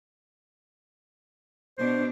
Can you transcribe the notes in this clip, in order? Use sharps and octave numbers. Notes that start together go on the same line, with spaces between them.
B2 D4 C5